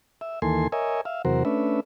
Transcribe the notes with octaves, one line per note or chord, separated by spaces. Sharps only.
E5
D#2 E3 A#3 A4 G#5 C6
A#4 C#5 D#5 E5 G#5
E5 F5
E2 C3 F#3 F#4 A#4 C5
A3 C#4 D4 B4 E5